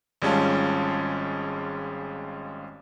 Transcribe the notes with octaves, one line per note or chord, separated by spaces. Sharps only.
G#1 G3 G#3 C#4 F4 A5